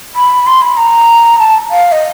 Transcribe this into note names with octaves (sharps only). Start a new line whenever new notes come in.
B5
C6
B5
A#5
A5
F5
D#5